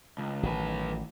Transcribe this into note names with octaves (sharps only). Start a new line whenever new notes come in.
C#2
A1 D#3 F#3 B4